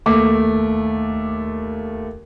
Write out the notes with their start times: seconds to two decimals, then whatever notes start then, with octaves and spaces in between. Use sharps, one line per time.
0.06 D#2 A3 D6